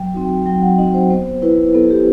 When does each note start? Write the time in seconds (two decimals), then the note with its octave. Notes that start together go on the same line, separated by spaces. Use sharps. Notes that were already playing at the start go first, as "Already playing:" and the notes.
Already playing: F#3 G5
0.14 C4 D#4 F#4
0.25 G5
0.46 F#3 G5
0.62 F#5
0.78 C4 D#4 F#4 D#5
0.94 C5
1.10 B3 C5
1.42 E4 B4
1.75 B3 A4
1.90 G4